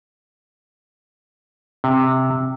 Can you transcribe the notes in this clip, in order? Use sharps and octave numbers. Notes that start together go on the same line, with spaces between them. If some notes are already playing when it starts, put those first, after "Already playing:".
C3